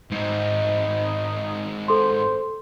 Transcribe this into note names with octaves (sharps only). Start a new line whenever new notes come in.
G#2 C4 D#4
A4 C5 C6